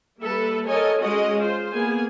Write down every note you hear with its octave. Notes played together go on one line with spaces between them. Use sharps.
G3 A#3 A4 B4 E5
A4 A#4 C#5 D#5 G#5
G#3 C#4 F#4 D#5
F4 C5
A#3 B3 G#4 G#5